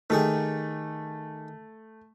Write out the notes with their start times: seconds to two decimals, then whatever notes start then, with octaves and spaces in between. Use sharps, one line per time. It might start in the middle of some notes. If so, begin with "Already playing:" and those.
0.10 D#3 A3 G4 G#4